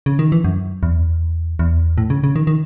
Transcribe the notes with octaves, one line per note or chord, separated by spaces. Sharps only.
C#3
D#3
E3
F#2
E2
E2
A2
C#3
C#3
D#3
D#3